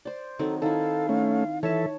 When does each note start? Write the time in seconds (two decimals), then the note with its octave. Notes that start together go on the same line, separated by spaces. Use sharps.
0.05 C5 D5
0.39 D#3 F#3 C4 A4
0.62 D#3 E4 A4 F5
1.09 A3 C#4
1.63 E3 A4 C#5 E5 A5